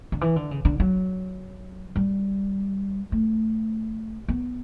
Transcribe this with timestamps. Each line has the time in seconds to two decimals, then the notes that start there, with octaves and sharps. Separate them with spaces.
0.12 D3
0.21 E3
0.36 D3
0.51 C#3
0.65 D3
0.80 F#3
1.96 G3
3.12 A3
4.28 B3